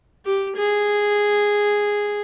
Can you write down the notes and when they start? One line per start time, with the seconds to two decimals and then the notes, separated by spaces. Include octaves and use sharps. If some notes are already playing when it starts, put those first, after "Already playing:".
0.26 G4
0.56 G#4